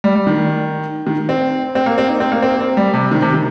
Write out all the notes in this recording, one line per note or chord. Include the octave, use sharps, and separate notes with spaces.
G3
G3
D#3
D#3
C4
C4
A#3
C4
D#4
C4
A#3
C4
C4
G3
C3
D#3
C3
D#3